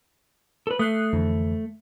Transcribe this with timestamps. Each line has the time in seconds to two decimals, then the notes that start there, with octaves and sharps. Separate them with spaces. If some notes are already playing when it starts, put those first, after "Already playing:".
0.67 A4 B4
0.79 A3 D#6 F#6 C7
1.13 F2 D3 E3